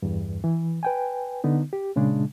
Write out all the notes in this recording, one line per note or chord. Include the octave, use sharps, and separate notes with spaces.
E2 G2
E3
B4 G5 G#5
D3 B3 D#4
G4
A#2 C#3 G#3 D4